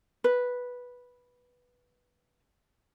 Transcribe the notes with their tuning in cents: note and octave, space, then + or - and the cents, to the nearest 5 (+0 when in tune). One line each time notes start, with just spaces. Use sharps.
B4 -5